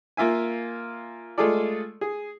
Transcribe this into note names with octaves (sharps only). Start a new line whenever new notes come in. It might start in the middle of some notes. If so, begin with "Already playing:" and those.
A#3 F4 E5 G#5
G#3 A3 F4 G#4 A4 D5
G#4